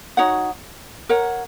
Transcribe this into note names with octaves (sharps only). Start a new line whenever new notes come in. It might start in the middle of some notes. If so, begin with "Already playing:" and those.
D#4 F#4 C#5 F#5
A#4 C#5 F#5